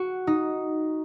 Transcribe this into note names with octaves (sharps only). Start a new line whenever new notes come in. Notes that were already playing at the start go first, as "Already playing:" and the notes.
Already playing: F#4
D#4